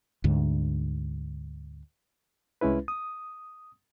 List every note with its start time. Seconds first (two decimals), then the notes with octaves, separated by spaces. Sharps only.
0.24 D2 G#2 D3
2.61 C2 G#3 C#4 E4 B4
2.88 D#6